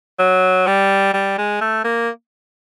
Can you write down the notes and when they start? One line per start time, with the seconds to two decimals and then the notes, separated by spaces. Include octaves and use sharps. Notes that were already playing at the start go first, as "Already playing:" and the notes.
0.19 F#3
0.67 G3
1.14 G3
1.38 G#3
1.61 A3
1.85 A#3